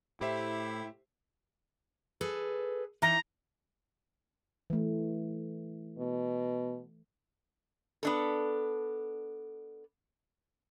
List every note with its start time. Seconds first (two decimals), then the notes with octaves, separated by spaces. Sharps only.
0.21 A2 E4 G4 C5 E5
2.21 G#4 A4 B4
3.02 E3 D#4 A#5
4.70 E3 A3
5.98 B2
8.03 B3 D4 A4